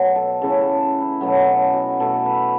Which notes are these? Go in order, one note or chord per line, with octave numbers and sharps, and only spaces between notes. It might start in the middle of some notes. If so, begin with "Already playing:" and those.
Already playing: B2 F#3 A3
A4
C#3 E3 A3 A4
A4
E4
B2 F#3 A3 B3
C#4
F#4
B2 A3 A4
B4